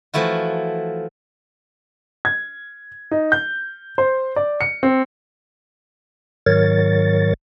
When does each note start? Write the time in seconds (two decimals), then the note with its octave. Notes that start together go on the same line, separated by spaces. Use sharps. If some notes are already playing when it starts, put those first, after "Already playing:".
0.14 E3 F3 A3 E4 F#4
2.25 G#6
3.11 D#4
3.32 G6
3.98 C5
4.36 D5
4.61 C#7
4.83 C4
6.46 G#2 D#3 F#3 A#4 C#5 A6